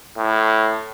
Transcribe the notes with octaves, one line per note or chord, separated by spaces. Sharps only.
A2